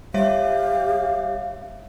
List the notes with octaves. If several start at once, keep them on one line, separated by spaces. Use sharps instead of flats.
G3 G4 C#5 E5 F5